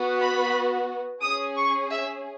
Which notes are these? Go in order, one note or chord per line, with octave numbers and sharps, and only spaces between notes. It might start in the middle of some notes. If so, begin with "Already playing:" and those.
Already playing: B3 F#4
B5
C#4 G#4 D#6
C#6
E5